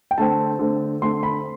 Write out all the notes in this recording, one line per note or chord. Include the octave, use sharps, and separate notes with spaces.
G5
D3 A3 C4 A5
D3 A3 C4
D3 A3 C4 C6
B5